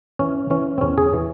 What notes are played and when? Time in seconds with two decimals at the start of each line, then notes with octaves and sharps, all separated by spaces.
0.19 E3 C#4
0.50 E3 C#4
0.78 C4
0.81 E2 C#4
0.98 G#4
1.13 E3